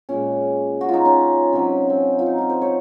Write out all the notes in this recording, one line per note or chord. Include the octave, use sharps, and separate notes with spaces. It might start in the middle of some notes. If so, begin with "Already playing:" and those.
A#2 G#3 C#4
F#4
D#4 F4
C#4
C3 F#3 C#4
C4
F4
D#4
F4
C5
C#5